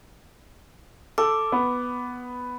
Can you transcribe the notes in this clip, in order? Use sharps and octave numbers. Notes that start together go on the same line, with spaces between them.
A4 D6
B3